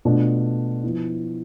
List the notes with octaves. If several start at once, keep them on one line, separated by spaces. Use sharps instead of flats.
B2 A3 D4 F4
F3 B3 E4